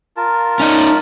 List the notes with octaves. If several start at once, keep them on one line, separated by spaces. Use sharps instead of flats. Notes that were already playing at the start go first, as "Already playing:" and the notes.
F4 A#4 A5
C#4 D#4